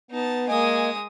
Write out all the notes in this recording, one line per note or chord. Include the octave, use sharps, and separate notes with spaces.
B3 D#4 A5
G#3 A#3 D#5 G#5 D#6